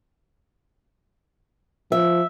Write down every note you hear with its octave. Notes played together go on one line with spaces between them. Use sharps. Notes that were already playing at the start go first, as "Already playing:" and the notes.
F3 E5